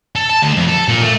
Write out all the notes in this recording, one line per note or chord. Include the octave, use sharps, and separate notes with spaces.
A4
A5
D2
F2
A4
A#2
A3